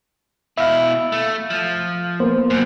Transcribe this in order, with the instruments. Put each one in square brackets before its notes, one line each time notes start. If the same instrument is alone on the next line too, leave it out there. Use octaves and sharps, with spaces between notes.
[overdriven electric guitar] B2 E4 [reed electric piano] E5 F5
[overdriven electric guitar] A3
F3
[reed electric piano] A#3 B3 C5
[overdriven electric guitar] F#2 C3